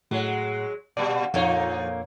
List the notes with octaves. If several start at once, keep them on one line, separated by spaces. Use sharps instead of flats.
A2 F#3 G#3
A#2 G3 D5
F2 A#2 D3 F3 A#3 D#4 C#5